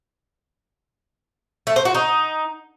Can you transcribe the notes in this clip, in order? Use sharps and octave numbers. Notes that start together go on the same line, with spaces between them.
A3
C5
F#4
D#4